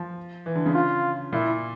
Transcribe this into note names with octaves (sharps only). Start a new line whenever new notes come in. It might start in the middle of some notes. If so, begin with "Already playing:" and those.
Already playing: F3
E3
D3
C#3
F4
A#2 E4